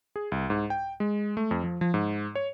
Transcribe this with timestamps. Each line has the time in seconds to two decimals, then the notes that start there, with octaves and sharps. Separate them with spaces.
0.16 G#4
0.32 C2
0.50 G#2
0.70 G5
1.00 G#3
1.37 A3
1.51 F2
1.64 F3
1.81 F3
1.94 G#2
2.35 C#5